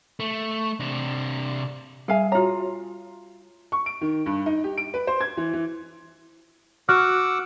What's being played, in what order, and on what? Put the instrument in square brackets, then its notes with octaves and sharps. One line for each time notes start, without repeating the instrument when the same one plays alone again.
[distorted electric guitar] A3
C3 D4
[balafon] G3 E5 [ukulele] G#4 F5 G#5
[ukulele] F4 A#5 [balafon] F#4 C#5
[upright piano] C#6
D7
D#3
G2
D#4
G4
D7
B4
C5
G#6
E3
E3
[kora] F#4 [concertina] F#5 D6 E6 [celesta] F6